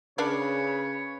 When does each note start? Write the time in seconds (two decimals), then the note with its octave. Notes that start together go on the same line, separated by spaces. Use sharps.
0.18 C#3 D4 A#4 B4 C#5 D5